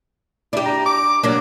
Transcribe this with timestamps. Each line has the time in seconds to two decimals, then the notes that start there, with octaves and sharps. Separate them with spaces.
0.53 D4 E4 G4
0.65 A#5
0.86 D6
1.23 F#3 A#3 D4